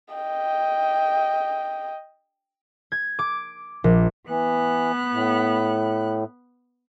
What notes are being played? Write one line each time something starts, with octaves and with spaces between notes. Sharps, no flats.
D#5 G5
G#6
D6
A#1
E3 B3 F#6
A2